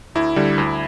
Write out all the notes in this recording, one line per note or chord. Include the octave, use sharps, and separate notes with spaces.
D2 E4
D3 G3
D2